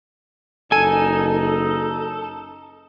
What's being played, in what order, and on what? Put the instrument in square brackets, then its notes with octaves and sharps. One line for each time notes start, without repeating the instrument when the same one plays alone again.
[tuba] F#1 [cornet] D#4 [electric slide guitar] A4 [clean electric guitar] G#5